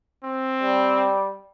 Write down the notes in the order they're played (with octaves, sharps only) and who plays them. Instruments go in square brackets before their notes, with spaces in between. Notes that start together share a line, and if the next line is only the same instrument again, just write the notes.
[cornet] C4
[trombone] G3